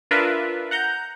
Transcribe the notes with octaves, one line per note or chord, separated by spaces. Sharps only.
D4 F4 A#4 B4 E5
F#5 A#5 G6